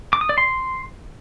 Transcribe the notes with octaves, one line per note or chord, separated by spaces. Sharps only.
D6
D#6
D5
C6